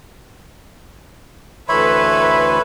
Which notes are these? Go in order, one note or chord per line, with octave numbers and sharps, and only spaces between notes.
D2 E3 A4 B4 C#5 E5 B5 C6